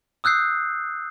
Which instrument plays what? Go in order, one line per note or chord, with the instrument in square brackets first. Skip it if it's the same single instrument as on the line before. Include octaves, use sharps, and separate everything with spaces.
[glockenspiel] D#6 E6 F#6 G6 C7